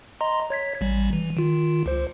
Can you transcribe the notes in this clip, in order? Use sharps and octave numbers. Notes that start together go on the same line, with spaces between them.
D#5 A#5 C6
C#5 G#6 B6
A1 G3
E3
D#3 F4
C#2 C5